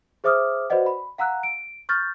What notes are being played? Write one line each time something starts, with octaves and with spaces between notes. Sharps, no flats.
G#4 C5 E5 D6 D#6 F6
F#4 B4 C5 D5 D#5 F#5
B5
F5 F#5 A#5 E6 F#6
D7
C#6 F6 G6 A6